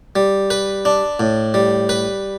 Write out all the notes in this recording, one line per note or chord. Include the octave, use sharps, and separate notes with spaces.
G3
B4
D4
A2
G3
B4